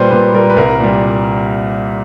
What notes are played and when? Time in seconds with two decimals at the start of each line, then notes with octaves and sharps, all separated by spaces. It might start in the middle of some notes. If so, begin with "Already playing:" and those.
Already playing: A#2 G3 B4 C5
0.11 A#2 B4
0.34 G3 A#4
0.50 B4
0.57 C2 A#4
0.80 A#2 G3